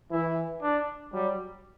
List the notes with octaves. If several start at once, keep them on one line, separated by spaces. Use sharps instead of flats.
E3 E4
D4
F#3 G3